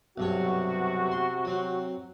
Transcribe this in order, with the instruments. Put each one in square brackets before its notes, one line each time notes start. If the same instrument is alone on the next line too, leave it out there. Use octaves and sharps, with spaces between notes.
[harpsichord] B1 G2 C#5 [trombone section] C3 F#4
[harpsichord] C6
F#3 C4